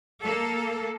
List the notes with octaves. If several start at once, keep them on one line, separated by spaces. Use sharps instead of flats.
A#3 A4